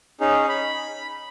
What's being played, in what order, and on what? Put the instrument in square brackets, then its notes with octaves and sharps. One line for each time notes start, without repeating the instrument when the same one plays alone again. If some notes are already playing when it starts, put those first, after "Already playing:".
[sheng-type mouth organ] C#4 D#4 G#4
B5